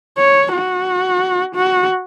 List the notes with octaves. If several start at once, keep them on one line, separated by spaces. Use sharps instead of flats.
C#5
F#4
F#4